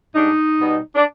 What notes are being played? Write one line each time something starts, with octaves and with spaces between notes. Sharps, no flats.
G#2 G3 D4 D#4
B2 G3 B3
D4